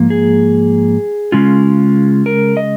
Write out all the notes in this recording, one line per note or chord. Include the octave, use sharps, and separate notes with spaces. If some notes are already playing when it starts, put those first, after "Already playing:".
Already playing: G#2 F3 A#3
G#4
C#3 G#3 C#4 F4
A#4
D#5